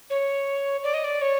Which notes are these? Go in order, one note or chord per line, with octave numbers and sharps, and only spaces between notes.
C#5
D5
D#5
D5
C#5